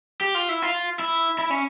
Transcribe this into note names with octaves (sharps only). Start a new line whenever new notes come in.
G4
F4
E4
F4
E4
E4
C#4